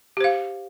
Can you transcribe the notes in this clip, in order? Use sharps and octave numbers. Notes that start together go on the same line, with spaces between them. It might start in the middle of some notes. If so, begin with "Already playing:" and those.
G4 C5 F5